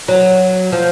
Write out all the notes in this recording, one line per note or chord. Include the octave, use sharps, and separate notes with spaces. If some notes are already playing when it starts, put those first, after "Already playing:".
F#3
F3